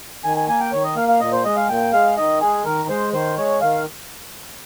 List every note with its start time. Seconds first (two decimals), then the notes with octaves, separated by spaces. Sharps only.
0.24 D#3 G#5
0.37 G#5
0.48 A#3 G#5
0.60 G5
0.72 D#3 C#5
0.84 D#5
0.96 A#3 F5
1.08 F5
1.20 A#2 D#5
1.32 C5
1.45 G#3 D#5
1.56 F5
1.68 A#2 G5
1.93 G#3 F5
2.17 D#3 D#5
2.41 G#3 G#4
2.65 D#3 A#4
2.89 G#3 C5
3.13 D#3 C5
3.37 G#3 C#5
3.61 D#3 F5